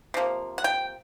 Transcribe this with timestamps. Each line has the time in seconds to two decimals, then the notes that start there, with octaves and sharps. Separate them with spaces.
0.14 C3 F3 A#3
0.58 F#5
0.64 G5